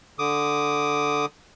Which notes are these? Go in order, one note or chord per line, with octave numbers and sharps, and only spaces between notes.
D3 D6 D#6